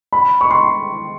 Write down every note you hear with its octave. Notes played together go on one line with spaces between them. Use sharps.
B5
C#6
C6